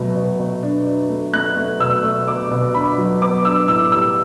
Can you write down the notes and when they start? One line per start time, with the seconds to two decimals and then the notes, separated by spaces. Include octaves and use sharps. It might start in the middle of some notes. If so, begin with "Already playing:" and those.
Already playing: B2 F#3 A3
0.16 B2
0.39 B2
0.63 D4
0.86 D4
1.09 A3
1.33 A3 F#6
1.57 A3
1.80 B2 E6
2.03 A3
2.27 B2 D6
2.51 B2
2.74 D4 B5
2.98 F#3
3.22 B3 D6
3.45 D4 E6
3.68 A2 E6
3.92 G3 E6